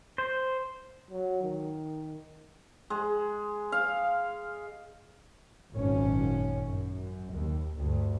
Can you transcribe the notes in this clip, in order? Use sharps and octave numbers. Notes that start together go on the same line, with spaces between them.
C5
F#3
D#3
G#3
F5
G#1 F#2 A#2 C#4
F#2
D#2
D2 G2